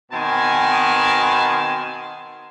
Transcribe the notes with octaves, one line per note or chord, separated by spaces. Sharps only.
B2 D#3 B3 C4 G#5 A5